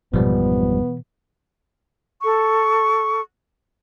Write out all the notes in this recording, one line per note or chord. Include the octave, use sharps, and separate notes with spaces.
G#1 F2 G#2 B2 E3 F3 G3 B3
A4 C#6